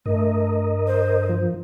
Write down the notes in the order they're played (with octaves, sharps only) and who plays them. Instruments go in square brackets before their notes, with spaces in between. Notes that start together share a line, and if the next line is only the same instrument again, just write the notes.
[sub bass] G2 [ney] A3 [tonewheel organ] A#4 D#5
[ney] C5
[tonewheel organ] F3